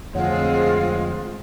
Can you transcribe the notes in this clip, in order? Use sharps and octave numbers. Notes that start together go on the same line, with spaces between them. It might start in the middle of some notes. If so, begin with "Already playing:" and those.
F2 D3 G#3 A3 C4 F4 C#5 F#5